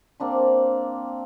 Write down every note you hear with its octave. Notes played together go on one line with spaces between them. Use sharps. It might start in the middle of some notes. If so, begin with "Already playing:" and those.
A#3 C4 D4 C6